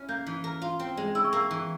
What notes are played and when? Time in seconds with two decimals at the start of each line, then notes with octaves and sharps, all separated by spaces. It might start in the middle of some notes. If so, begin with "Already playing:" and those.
Already playing: C#4 E4 F6
0.09 A#3 G6
0.26 E3
0.44 A#4
0.62 F4
0.79 C4
0.97 G#3
1.15 E4 E6
1.24 C#6
1.33 A#3 E6
1.51 E3